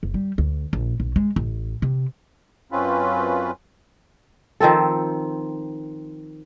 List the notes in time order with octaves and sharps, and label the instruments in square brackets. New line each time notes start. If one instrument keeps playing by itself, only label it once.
[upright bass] F#1
G3
D2
A#1
B1
G#3
A1
C3
[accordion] F#2 C4 C#4 F4 B4
[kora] D#3 F3 C4 A4